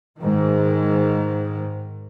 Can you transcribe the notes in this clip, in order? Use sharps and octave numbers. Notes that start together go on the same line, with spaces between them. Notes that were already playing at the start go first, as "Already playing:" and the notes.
G#2 D#3